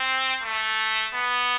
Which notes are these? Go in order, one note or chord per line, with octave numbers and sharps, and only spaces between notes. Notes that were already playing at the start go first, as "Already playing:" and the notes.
Already playing: C4
A3
B3